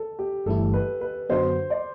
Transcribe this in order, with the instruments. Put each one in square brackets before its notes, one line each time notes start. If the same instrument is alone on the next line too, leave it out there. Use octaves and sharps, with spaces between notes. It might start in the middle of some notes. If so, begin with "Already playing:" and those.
Already playing: [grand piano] A4
G4
[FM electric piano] G1 G2 E3 A3 E4 [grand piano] A4
[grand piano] B4
B4
[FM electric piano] F#2 D3 F#3 B3 F#4 [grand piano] C5
[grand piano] D5